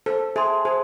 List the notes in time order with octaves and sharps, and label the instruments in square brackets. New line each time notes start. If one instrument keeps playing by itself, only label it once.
[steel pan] A4 [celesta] C5
[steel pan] G#4 [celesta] E5 A5 C6
[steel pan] G#4 [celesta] C5